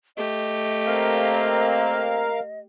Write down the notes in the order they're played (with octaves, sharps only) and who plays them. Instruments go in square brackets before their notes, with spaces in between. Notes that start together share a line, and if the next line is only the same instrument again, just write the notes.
[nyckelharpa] A3 G4 [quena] D#5
[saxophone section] A#3 C4 [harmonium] A#4 F5